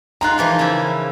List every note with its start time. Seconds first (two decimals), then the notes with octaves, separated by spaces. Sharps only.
0.21 G#3 D#4 F4 A#5 F#6
0.38 E3 F3 A#3
0.59 C#3 E4